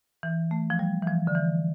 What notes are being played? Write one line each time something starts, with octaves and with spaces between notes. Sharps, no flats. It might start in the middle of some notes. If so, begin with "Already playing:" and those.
E3
A3
F3
G3
E3
F3
D3
E3